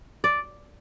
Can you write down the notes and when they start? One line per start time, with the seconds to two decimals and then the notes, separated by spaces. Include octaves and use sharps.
0.24 D5